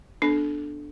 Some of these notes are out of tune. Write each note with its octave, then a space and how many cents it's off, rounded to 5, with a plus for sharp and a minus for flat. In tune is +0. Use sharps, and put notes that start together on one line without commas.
B3 +0 D4 +5 A4 -15